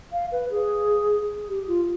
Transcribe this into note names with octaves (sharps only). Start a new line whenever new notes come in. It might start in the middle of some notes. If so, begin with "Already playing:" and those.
F5
B4
G#4
G4
F4